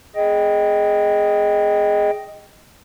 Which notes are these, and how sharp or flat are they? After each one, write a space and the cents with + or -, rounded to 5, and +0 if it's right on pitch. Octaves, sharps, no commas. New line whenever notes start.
G#4 +5 D#5 +0 G5 +0